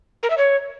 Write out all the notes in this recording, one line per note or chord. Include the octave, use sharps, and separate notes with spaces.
A#4
E5
C#5